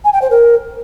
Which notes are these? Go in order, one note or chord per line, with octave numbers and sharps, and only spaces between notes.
G#5
G5
C5
A#4